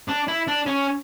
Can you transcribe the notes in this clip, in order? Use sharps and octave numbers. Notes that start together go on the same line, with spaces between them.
D4
E4
D4
C#4